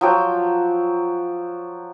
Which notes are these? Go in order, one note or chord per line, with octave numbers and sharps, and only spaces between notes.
F3 F#3 G5